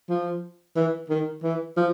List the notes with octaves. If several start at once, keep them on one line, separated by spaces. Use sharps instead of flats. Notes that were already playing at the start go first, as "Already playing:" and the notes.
F3
E3
D#3
E3
F3